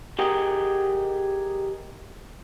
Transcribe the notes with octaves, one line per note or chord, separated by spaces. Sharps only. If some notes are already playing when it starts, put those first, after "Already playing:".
G4 G#4 A#4 D#5 F#5 G5